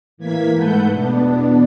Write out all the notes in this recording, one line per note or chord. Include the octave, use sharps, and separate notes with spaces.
A2 E3 A#3 G#6 B6
G#2 A3 A4 B4 F#5 G6
E2 B2 B3 D4